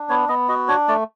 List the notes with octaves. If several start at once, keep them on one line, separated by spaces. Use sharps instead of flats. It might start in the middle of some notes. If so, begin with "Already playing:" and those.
Already playing: D4
B3 C#5
B3 D#5
F#4 D#5
D4 C#5
A3 D5